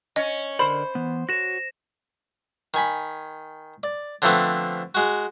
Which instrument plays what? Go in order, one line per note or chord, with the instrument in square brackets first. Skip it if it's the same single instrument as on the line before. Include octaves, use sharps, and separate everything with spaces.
[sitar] C#4 [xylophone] D#5
[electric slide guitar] D3 A#4 D5 [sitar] C5 [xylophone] B5
[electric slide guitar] E3 B3
[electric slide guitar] F#4 C#5 [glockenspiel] A#6 E7
[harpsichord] D#3 G#5 B5
D5
D3 F3 A3 B3 C4
G#3 F#4